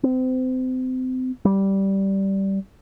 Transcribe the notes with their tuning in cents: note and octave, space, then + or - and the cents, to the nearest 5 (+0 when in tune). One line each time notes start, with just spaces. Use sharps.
C4 -30
G3 -10